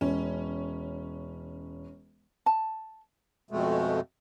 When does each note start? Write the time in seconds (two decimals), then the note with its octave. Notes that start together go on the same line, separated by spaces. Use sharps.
0.01 E1 C#4
2.46 A5
3.51 F2 B2 G#3 A3